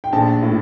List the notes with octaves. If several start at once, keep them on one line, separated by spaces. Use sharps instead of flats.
G5
A#1 A5
A2